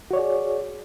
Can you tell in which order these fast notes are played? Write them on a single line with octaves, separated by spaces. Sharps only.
F#4 C#5 D5 G#4